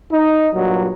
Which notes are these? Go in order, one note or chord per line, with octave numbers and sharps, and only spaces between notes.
D#4
G2 A#2 F#3